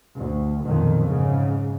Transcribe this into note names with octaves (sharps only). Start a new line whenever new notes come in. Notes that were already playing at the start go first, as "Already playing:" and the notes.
D2
B1 F2 A#2 D#3
G#2 C#3